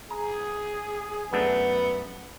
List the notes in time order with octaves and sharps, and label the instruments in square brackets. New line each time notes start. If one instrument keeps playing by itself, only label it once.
[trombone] G#4 [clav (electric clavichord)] A#5
[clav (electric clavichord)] F#2 A3 D4 [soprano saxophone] B3